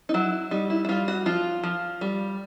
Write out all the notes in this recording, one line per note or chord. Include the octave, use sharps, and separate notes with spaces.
D#4
F#3 E4
G3 D#4
E4
E4
G3 F4
F#4
F3 F4
F3
G3